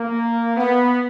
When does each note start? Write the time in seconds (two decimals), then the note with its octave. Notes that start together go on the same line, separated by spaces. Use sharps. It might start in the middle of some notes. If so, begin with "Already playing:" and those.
Already playing: A#3
0.56 B3